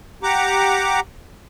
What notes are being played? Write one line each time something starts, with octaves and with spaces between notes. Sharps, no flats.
G4 F#5 A#5 D6